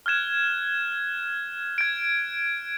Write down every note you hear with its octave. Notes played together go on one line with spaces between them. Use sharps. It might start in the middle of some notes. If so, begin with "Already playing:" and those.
F6 F#6 G#6 E7
G#6 D7